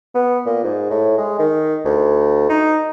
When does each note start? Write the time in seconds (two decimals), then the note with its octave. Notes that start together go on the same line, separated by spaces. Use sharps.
0.15 B3
0.46 A#2
0.64 G#2
0.90 A2
1.18 G#3
1.39 D#3
1.85 D2
2.49 D#4